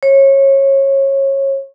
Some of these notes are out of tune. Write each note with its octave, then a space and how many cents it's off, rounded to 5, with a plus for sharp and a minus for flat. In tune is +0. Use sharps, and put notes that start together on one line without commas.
C#5 -25